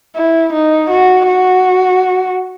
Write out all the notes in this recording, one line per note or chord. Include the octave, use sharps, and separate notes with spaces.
E4
D#4
F#4
F#4